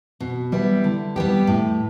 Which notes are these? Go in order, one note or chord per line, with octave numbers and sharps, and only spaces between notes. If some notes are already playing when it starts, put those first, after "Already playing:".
B2
G3 B3 E4
D3
G3 B3 G4
A2